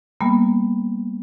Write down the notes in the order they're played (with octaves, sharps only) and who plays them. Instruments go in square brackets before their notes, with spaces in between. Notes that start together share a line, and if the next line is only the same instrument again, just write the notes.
[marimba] G3 A#3 B3